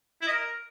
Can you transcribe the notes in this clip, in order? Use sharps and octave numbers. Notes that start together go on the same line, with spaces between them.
E4
D#5
A#4